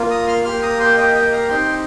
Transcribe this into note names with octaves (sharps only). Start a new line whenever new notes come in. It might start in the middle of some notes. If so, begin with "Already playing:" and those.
Already playing: A#3 F4
A#5 D#6
C6 F6
A#3 G4 C6 F6
A#5 D#6
G5 C6
D#5 G5
D#5 G5
F5 A#5
C4 D#4 G4 G5 C6